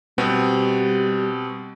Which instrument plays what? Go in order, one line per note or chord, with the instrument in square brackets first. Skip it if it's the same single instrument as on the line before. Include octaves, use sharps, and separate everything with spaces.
[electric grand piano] B2 B3 C4 [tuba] G3